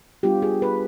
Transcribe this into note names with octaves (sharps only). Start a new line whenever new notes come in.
G3 B3 D4 F4 G4
G#4
B4